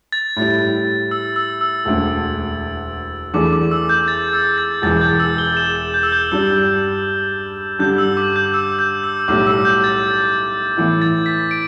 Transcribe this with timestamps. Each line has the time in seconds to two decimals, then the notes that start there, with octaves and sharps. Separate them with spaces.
0.12 A6
0.36 A2 G3 E4
1.11 E6
1.36 E6
1.61 E6
1.85 E1 D2 D3
3.33 E2 E3 A3 D4 D6
3.53 D6
3.71 E6
3.89 G6
4.08 A6
4.33 E6
4.58 A6
4.82 E1 E2 E3 A6
5.01 G6
5.20 E6
5.38 G7
5.57 E7
5.76 E7
5.94 G6
6.03 E6
6.12 G6
6.31 G2 G3 D4 E6
7.79 G2 D3 G3 G6
7.98 E6
8.17 D6
8.36 G6
8.54 E6
8.79 G6
9.04 E6
9.28 B1 A2 G3 D6
9.47 E6
9.65 G6
9.84 A6
10.77 A2 E3 B3 E4
11.02 A6
11.26 B6
11.51 D7